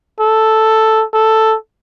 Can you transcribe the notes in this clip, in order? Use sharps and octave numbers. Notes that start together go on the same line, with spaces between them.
A4
A4